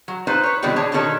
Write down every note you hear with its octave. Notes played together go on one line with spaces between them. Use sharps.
F#3
D#4 F4 B4 C5
B4 C#5
B2 D3 E3 G3 G#3 C4
D3 G#4 C#5 A5
B2 D3 D#3 C#4 A4 C#5